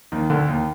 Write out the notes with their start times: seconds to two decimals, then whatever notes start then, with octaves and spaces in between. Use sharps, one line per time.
0.12 D#2 D#3
0.30 D2 D3
0.48 D#2 D#3